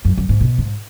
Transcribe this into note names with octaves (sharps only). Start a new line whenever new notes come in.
F#2
F#2
G#2
B2
G#2